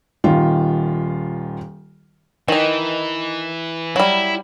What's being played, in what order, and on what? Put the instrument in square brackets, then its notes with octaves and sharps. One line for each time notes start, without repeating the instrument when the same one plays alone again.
[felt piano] D#1 D#3 F4
[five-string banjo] D#3 D#4 [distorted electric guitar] E3
[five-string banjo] F#3 G3 [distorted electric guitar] E4